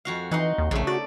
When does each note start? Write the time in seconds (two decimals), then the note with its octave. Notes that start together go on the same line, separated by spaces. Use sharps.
0.05 F2 F#4 F5
0.31 E3 D#4 F#5 C6
0.58 D#2
0.71 A#1 C#3 A3
0.87 F#4 D5